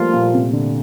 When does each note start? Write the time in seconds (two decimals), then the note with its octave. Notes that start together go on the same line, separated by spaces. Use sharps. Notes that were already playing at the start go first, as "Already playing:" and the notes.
Already playing: F3 G3 A3 A#3 F4
0.14 A#2
0.34 C3
0.53 D3